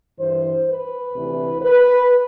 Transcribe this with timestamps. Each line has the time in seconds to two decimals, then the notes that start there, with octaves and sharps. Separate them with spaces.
0.19 G2 E3 C5
0.67 B4
1.14 D2 C3 E3
1.62 B4